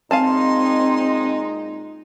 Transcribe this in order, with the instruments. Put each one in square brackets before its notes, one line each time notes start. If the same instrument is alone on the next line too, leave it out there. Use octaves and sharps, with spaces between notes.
[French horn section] A#2 G#3 D#4 [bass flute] C4 [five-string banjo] F5 G#5 A5 [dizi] C6